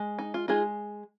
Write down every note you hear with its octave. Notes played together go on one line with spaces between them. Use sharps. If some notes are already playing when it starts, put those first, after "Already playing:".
Already playing: G#3
D#4
F4
G#3 D#4 F4 G#4